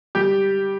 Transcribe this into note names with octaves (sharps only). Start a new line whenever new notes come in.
G3 G4